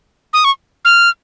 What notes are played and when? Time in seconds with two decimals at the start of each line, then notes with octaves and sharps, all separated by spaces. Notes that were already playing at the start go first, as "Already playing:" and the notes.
0.33 D#6
0.44 C#6
0.85 F6